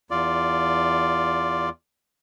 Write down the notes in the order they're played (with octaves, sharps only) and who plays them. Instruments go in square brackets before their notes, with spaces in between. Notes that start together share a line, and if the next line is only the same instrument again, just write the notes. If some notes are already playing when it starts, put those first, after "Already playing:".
[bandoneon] E2 F4 D5